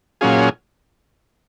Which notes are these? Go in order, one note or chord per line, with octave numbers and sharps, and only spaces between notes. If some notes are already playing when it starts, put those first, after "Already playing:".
A#2 F#3 C#4 F4 G#4